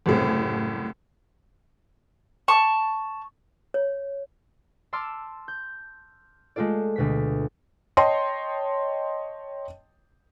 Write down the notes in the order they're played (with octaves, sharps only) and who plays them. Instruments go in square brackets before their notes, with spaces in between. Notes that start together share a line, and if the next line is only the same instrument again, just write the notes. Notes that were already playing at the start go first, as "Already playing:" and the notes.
[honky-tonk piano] F#1 C2 A2
[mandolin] A5 C#6
[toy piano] C#5
[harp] A5 C6 D6 E6 F6
G6
G#3 A3 F4 A4 D5
D2 B2 B6
[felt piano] C#5 D#5 G5 A5 C6